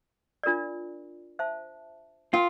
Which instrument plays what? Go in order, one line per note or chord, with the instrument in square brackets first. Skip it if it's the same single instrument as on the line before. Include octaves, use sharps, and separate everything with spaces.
[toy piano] D4 F4 A#4 D5
C5 E5 A5
[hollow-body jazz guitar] F4 [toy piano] A#4 G5